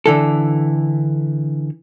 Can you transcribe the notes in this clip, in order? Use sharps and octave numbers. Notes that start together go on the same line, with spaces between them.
D3 E3 A4